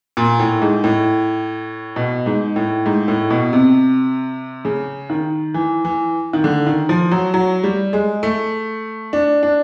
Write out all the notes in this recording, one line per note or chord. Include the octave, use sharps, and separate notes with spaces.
A#2
A2
G#2
A2
B2
G#2
A2
G#2
A2
B2
C3
C#3
D#3
E3
E3
D#3
D3
D#3
F3
F#3
F#3
G3
G#3
A3
D4
D4